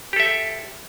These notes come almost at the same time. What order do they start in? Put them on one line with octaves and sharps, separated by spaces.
G4 A4 E5